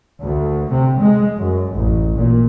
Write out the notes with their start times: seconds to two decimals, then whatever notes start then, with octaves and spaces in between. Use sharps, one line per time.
0.21 D2
0.70 C3
1.01 G#3
1.38 F#2
1.76 A1
2.17 A#2